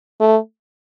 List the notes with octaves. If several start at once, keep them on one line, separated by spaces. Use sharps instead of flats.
A3